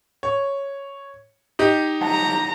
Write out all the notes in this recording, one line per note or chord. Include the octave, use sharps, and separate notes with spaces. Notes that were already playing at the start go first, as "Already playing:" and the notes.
C#5
D#4 G4 D#5
A#5